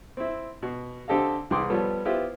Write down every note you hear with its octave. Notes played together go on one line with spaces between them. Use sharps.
C4 E4
B2
D3 C4 G4 A4 D#5 F5
C2 E3 G#4 G5 C6 D6
F3 G3 B3 A4 C#5
B3 E4 F4 G4 C5